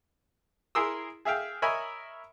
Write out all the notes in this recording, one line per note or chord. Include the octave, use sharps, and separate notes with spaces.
E4 G#4 A#4 C6 D#6 E6
G#4 E5 F5 G5
A#4 C#5 D#5 E5 G#5 B5